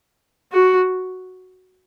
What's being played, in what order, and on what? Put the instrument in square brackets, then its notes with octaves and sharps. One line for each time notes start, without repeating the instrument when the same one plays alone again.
[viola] F#4